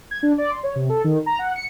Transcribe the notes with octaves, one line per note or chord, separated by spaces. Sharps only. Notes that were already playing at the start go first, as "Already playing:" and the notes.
G#6
D4
D5
C6
C#5
C3
A4
D#3
A#5
F#5
C#7